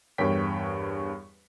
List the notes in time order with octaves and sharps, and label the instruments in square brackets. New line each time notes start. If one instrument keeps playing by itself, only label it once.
[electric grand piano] E2 G2 A#4 C#5 G5 B6